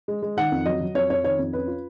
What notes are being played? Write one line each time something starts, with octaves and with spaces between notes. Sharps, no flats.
G#3
G#3
D#3 F#5
F2
F#3 D#5
F#3
F2 C#5
F2 C#5
D#3 C#5
F2
C#4 B4
F4